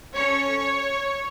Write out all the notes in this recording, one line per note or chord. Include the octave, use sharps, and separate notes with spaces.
C#4 A4 C#5